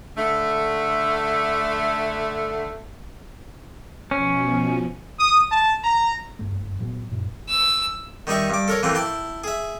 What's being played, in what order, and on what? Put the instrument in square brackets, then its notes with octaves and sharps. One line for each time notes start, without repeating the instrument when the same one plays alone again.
[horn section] D3 A3
[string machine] B2 F3 [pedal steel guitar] C#4
[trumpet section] D#6
A5
A#5
[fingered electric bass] F#1 G2 A3
A#2 F#3 B3
F#2 A#2
[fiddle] E6
[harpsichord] D#3 G3 D#4 E5 C#6
G2 D6
A4 A#4 C#5
E3 A3 A#3 C4
E4 G5 A5
G#4 E5